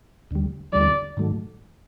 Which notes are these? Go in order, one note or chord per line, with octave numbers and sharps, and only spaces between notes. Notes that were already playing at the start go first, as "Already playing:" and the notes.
D#2 D3 G3
D#2 D3 G3 D5
G#2 D#3 F#3 A3